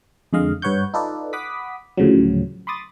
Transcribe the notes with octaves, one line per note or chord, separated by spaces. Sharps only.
F2 D3 G#3 D#5 F5
G2 B4 C#5 F#5 C#6 G6
D#4 F4 A4 B4 D5
F#5 B5 D6 D#6 B6
D2 A2 C#3 F3 F#3
B5 C6 D6 D#6 A6